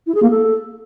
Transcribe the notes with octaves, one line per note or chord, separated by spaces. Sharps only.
E4
G#4
A#3
A4